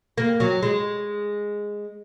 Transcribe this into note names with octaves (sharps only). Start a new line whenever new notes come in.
A#3
F#3
G#3